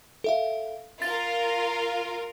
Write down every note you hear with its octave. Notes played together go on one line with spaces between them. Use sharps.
A4 E5 F5
F4 A#4 A6